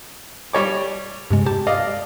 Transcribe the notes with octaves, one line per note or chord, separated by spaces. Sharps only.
G3 C#5 D6
G2 C3 G#3
G4 A5
D5 D#5 F5